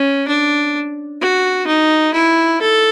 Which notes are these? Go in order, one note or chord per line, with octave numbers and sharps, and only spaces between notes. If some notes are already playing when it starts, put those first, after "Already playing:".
Already playing: C#4
D4
F#4
D#4
E4
A4